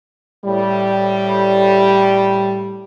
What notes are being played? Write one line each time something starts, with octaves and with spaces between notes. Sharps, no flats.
A2 G3